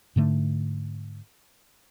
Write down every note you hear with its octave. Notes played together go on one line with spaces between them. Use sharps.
G#2 D3 A3